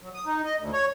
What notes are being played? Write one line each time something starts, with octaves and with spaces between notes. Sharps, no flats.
F#3
D#6
D#4
D#5
D2
C#5